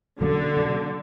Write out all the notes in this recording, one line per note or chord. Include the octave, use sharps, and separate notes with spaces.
B2 D3 F#3 A#3 C#4
B2 F#3 A#3 C#4